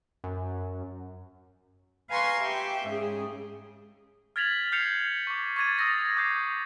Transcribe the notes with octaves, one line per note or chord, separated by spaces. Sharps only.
F#2
B4 F5 G#5 A#5 C6 C#6
G4 E5 G5
G#2 C#3 G#4
F6 G#6 A6 B6 F7 F#7
F6 G6 C7 C#7 F7
C#6 D6
C#6 D6 G#6 A6 D#7
D#6 E6 A6 A#6 C7
D6 G6 C7